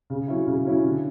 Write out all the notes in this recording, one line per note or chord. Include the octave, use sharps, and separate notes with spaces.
C#3
F#3 C#4 E4
C#3
F#3 C#4 E4
D3